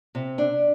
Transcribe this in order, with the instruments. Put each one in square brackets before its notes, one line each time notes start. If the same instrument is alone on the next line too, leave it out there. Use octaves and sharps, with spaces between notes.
[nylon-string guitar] C3
D4